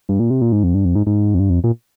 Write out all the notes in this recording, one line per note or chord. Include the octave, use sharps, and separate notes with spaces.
G2
A#2
C3
A#2
G#2
F2
G2
F2
G#2
G#2
F2
G2
F2
A#2